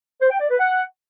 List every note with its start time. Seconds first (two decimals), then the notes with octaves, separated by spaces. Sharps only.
0.21 C5
0.31 G5
0.40 D5
0.50 B4
0.59 F#5